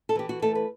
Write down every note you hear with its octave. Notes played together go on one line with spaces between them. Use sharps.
A4
E3 G4
F#4
A3 A4
B4